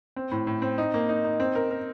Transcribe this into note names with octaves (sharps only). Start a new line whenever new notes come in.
C4
A2
A2
C4
D#4
A#3
D#4
D#4
C4
A#4
A#4